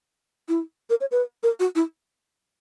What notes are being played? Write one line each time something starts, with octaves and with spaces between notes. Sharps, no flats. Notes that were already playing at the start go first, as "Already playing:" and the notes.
E4
A#4
C#5
B4
A#4
F#4
E4